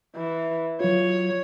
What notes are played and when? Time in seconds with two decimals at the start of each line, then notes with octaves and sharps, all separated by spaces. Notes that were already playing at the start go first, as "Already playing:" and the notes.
0.16 E3
0.80 F#3 F4 C#5